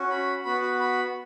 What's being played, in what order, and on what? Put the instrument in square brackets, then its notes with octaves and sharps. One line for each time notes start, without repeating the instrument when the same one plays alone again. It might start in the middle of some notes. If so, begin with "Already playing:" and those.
Already playing: [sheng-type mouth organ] C#4 F#4
B5
B3 F#4 B5
B5
B5